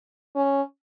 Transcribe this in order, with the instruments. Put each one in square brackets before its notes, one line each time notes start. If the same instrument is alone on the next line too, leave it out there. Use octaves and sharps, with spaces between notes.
[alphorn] C#4